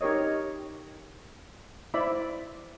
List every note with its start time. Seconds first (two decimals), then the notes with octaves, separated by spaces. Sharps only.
0.01 D#4 G4 A#4 C#5 D#5
1.94 E4 C5 D5 E5 B5